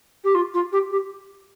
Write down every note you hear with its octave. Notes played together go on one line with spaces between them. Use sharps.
G4
F4
F4
G4
G4